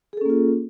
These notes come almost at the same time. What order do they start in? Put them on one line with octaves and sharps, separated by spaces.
G#4 A4 C#4 A#3 F4